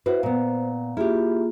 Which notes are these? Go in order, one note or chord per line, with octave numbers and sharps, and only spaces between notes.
E4 F#4 B4 C5
A#2 B3
A#3 E4 F4 G4 G#4